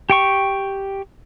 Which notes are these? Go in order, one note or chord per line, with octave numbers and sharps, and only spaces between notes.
G4 G5 C#6